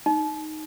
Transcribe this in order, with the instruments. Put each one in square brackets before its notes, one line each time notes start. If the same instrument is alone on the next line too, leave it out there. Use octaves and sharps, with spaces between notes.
[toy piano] D#4